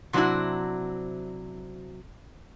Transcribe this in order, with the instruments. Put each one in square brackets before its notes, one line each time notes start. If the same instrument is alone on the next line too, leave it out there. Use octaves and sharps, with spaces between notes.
[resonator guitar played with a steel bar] C3 F#3 C4 D4 E4 F#4